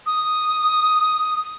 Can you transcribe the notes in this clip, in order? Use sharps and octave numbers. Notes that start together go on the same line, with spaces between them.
D#6